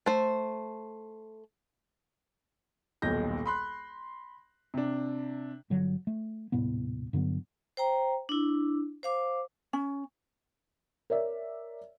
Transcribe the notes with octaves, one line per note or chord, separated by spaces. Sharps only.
A3 C5
D#1 B1 A#2 G6 A#6
B5 C6 F#6
C3 D4
G1 D3 F#3
A3
D#1 A2 C3 B3
G2 D3 F#3 B3
C5 G5 A#5
D4 E4
C5 F5 D6
C#4
A#4 C#5 D5 E5